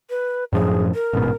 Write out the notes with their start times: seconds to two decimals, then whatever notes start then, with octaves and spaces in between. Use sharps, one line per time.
0.10 B4
0.53 F#2 A2 F3 G#4
0.94 A#4
1.13 A1 G#2 B2